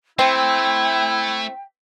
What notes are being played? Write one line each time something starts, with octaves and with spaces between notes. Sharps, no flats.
A3 C4 E4 G5